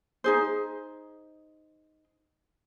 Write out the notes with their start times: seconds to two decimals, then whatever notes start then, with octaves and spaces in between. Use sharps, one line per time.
0.24 D#4 G#4 C5